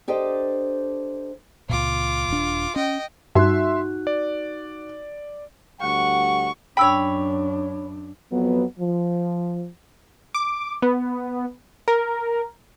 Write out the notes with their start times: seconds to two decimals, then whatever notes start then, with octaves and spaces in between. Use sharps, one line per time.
0.08 D4 G4 A4 C5 D#5
1.69 C#2 A#2 F4 D6
2.29 D#1 D4
2.76 C#4 D#5 G5
3.35 G2 D#4 F#4 E5 C6 F#6
4.07 D5
5.81 D2 G3 F#5 C#6
6.77 F#2 D4 C#5 G5 B5 E6
8.31 F2 F#3 B3
8.79 F3
10.35 D6
10.82 B3
11.88 A#4